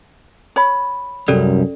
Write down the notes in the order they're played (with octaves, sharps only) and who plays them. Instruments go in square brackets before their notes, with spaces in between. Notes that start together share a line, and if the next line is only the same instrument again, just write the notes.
[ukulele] C#5 B5
[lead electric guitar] C2 G3 [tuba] F#2 [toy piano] C#4 A4 D5